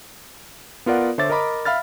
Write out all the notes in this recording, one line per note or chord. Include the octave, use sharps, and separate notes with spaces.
B3 F4 A#4 D5 F#5
D3 C5 C#5 E5 D6 A6
A#4 D#5 A#5 B5 D6
E5 F5 B5 F6 A6